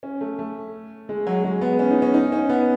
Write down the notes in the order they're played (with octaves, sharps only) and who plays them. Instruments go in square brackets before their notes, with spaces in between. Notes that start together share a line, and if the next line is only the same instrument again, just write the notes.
[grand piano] C#4
A3
A3
G#3
F#3
G#3
B3
C#4
D#4
C#4
D#4
C#4
B3